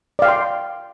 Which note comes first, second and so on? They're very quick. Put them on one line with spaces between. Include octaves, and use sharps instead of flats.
D5 F5 G5 C6